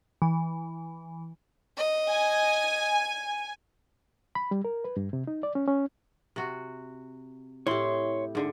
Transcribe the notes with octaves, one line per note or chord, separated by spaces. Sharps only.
E3
D#5
G#5
B5
G3
A#4
B4
G2
C3
D#4
D5
C#4
C#4
C3 F#4
A2 E4 G4 C#5 C6
G#2 D3